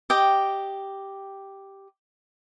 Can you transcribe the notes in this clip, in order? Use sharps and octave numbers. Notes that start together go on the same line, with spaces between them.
G4 D#5 G5